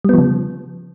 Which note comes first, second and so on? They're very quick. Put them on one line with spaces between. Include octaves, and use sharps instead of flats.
G3 B3 F3 C#3